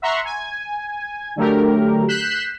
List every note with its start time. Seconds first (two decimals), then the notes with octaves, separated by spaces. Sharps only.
0.02 E5 F#5 A#5 C6 C#6
0.25 G#5
1.36 D3 F#3 A3 G4 A#4
2.08 F#6 G6 B6 C7 E7